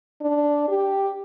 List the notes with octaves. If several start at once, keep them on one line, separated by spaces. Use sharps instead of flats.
D4
G4